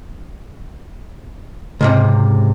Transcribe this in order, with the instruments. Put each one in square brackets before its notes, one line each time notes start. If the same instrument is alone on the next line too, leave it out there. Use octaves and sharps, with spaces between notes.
[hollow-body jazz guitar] C#2 G#2 C3